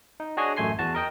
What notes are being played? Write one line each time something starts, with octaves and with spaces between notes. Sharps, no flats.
D#4
D4 F#4 G#4 C#5 D#5 G#5
A1 F#2 A3 G#5 C6 C7
E2 F#4 A5
A#4 D#5 G5